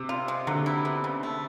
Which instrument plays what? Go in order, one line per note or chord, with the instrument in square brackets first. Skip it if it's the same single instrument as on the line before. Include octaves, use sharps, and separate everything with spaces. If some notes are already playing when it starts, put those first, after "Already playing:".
Already playing: [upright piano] C3
[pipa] F4
G#3
[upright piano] D3 [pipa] F#3
[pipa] E4
B3
C#3
A3